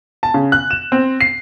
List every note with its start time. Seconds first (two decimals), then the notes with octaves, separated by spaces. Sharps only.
0.23 A5
0.34 C#3
0.52 F#6
0.70 E7
0.92 C4
1.21 C7